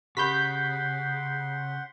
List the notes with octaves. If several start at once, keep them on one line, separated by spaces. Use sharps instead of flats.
C#3 G4 F#5 B5 C6 G6 B6